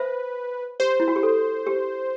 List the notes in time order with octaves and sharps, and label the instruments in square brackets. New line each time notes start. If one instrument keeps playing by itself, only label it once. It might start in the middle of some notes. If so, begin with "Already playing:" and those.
Already playing: [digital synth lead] B4 [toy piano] C5 E5
[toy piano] G4 [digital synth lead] C5
[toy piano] E4
F#4
G4
A4
G4